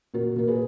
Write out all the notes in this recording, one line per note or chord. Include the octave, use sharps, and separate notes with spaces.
A#2 F#4 A#4
A#2 A#4
G#4 B4